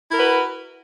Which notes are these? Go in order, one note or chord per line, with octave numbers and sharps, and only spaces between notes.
E4 F#4 A#4 B4